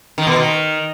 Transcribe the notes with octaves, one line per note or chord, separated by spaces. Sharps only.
D#3
B2
D#3